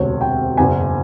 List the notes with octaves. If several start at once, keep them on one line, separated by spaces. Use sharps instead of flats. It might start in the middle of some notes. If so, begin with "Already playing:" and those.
Already playing: E1 D2 C3 C#5
G5
F#1 E2 B2 G#5